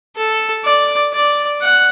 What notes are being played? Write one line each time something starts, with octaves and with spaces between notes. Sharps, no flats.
A4
D5
D5
F#5